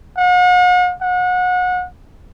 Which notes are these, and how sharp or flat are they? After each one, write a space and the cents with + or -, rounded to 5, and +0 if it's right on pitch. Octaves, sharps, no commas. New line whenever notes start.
F#5 -45
F#5 -30